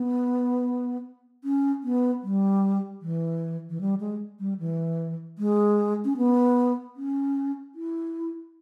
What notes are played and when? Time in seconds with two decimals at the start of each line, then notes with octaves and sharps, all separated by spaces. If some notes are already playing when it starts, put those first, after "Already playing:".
Already playing: B3
1.44 C#4
1.84 B3
2.23 G3
3.02 E3
3.70 E3
3.81 G3
4.00 G#3
4.40 G3
4.60 E3
5.38 G#3
6.05 C#4
6.17 B3
6.96 C#4
7.75 E4